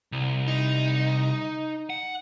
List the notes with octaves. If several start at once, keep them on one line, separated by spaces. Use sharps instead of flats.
C2
D#4
F#5